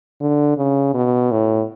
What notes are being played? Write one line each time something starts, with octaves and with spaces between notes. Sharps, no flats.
D3
C#3
B2
A2